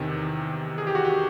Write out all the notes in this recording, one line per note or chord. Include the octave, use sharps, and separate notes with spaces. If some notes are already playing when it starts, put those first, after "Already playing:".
Already playing: E2 C3 D#3
G#4
G4
F#4
G4